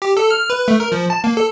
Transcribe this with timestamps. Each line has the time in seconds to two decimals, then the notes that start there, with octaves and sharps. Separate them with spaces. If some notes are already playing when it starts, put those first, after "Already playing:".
0.02 G4
0.17 A4
0.30 F6
0.50 B4
0.68 A3
0.80 A#4
0.92 F3
1.10 A5
1.24 A#3
1.37 A4